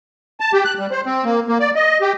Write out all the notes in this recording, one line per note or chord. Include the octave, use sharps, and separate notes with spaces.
A5
G4
F#6
G3
C5
C4
A#3
A#3
D5
D#5
G4